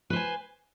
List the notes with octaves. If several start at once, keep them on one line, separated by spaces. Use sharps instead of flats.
B4 C5 G#5